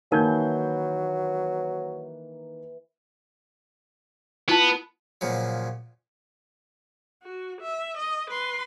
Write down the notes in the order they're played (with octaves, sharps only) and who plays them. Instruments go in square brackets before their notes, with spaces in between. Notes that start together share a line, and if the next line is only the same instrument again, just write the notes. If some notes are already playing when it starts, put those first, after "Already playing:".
[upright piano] D#3 A#3 G6 [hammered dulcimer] E3 [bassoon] F#3 [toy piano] D#4 A#4 F5
[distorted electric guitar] B3 [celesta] E4 F4 A5
[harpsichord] A#2 C#3 F3 F#3
[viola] F#4
E5
D#5
B4 C6